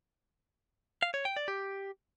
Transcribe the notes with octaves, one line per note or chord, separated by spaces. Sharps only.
F5
C#5
G5
D5
G4